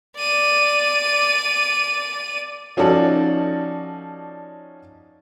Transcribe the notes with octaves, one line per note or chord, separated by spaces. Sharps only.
D5 D#7
F3 C#4 D#4 F#4 A4 D5